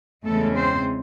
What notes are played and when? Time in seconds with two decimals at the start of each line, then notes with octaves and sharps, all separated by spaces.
0.25 E2 C#3 G#3 A3 C#4 A4
0.55 C4 C5